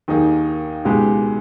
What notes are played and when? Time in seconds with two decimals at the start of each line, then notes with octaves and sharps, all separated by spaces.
0.08 D#2 D#3 A#3 D#4 G#4
0.85 C#2 B2 G#3 D#4 G4